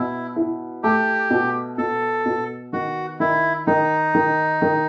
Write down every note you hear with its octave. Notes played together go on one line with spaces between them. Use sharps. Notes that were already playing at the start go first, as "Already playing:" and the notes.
Already playing: B2 E4
E4
A3 G4
B2
B2 A4
B2
D#3 F#4
D#3 E4
D#3 D#4
D#3
D#3